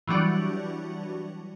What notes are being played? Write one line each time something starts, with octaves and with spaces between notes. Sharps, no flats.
E3 F#3 G3 D4 F#4